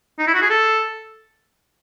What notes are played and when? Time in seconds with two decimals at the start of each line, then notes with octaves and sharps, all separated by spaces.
0.19 D#4
0.27 E4
0.34 F#4
0.42 G#4
0.50 A4